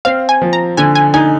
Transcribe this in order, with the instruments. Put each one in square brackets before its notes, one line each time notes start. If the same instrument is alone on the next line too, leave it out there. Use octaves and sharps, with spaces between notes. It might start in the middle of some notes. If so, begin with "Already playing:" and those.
[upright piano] C4 [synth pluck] F5
[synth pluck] G#5
[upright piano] F3
[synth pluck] A#5
[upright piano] D3 [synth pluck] G#5
[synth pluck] G#5
[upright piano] D#4 [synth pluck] G#5